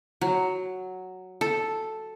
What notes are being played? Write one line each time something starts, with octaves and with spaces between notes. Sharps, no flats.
F#3
A4